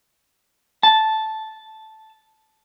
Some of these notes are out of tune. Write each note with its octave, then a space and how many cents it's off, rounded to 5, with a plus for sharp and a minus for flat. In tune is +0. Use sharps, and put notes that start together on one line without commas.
A5 -5